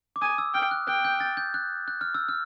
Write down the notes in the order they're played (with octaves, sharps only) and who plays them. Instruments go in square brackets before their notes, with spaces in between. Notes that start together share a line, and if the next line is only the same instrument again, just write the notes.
[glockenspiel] D6
[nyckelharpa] G#5 [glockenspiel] D#6
[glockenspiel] E6
[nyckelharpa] G5 [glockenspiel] F6
[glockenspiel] F#6
[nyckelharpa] G5 [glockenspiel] F#6
[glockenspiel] G6
A6
G6
F#6
F#6
F6
E6
F6